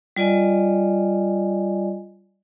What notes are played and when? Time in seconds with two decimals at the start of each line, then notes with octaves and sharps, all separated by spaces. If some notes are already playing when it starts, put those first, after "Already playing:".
0.17 G3 F4 D5 D#5 G#5